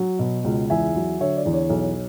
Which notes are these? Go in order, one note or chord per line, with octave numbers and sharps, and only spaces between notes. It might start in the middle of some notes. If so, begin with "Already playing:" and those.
Already playing: F#3
B2
C#2
E2 E5 G#5
F#3
D3 C#5 E5
D5
E2
C#5
B1